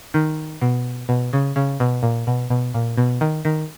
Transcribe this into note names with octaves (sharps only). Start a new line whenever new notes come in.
D#3
B2
B2
C#3
C#3
B2
A#2
B2
B2
A#2
B2
D#3
D#3